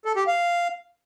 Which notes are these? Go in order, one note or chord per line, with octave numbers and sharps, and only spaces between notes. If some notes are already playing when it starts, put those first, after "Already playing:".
A4
G4
F5